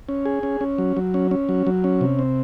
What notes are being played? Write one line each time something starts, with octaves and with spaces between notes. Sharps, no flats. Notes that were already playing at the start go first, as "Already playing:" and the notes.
C#4
G#4
C#4
C#4
F#3
F#3
C#4
C#4
F#3
F#3
C#4
C3
C4